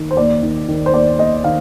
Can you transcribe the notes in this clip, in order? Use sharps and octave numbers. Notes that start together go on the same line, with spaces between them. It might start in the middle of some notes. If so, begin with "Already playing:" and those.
Already playing: D#3
C5
D#2 D5
D#3
D#3
C5
D#2 D5
D#2 D#5
D#3 F5